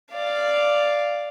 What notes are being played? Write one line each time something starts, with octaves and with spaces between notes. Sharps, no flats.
D5 F5